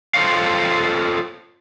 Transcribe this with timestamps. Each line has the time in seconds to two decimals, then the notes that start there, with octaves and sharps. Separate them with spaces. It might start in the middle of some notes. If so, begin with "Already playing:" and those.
0.14 F4 A4 C5 C#5 F5